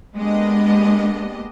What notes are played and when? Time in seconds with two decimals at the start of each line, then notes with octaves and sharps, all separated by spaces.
0.16 G#3 A#3 B3 D4 G4 D#5